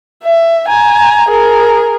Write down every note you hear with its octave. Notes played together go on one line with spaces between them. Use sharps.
E5
G#5 A#5
G#4 A#4